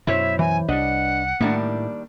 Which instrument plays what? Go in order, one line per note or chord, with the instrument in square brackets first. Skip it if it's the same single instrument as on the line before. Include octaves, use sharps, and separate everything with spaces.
[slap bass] F#2 B2 F#3 [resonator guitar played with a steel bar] E4 C5 C#5 [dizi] E5
[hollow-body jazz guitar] E3 [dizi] G#5
[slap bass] C2 G3 [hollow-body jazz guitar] D4 B4 D#5 [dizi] F#5
[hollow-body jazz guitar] A2 [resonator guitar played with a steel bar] D#3 G3 D4 [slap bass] A#3